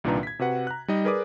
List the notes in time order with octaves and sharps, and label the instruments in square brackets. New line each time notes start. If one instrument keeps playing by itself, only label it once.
[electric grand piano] C2 A#2 D#3 D4 B4 A#5
G#6 B6
C3 F#4 B4 F#5
A#5 F#6
G3 D#4 D#5
G#4 A#4 B4 D5 D6 D#6